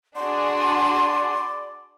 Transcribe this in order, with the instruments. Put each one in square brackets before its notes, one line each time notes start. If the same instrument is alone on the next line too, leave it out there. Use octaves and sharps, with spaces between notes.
[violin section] D4 F#4 G#4 [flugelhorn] D5 [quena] C6